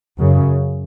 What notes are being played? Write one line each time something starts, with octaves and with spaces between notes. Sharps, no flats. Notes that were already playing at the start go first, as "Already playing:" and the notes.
F#2 C#3